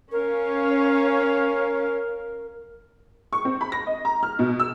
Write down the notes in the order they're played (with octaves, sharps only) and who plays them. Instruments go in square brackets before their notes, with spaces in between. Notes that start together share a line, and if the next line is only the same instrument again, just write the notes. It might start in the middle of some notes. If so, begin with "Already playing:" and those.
[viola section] C#4 C#5 F5 [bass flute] A#4
[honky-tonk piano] C#6
C4
B5
A#6
D#5
A#5
F6
B2
E6